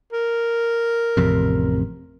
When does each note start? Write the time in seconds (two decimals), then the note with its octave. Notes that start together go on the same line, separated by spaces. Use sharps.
0.12 A#4
1.17 A1 F2 C3